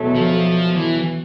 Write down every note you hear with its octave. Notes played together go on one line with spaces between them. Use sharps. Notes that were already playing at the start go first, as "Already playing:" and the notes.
Already playing: E2 B2 F#3 A3
F3
E3